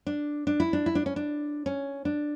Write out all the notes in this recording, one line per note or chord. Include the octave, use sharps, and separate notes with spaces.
D4
D4
E4
D4
E4
D4
C#4
D4
C#4
D4